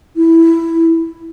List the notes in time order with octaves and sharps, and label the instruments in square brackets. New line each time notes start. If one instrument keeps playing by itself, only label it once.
[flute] E4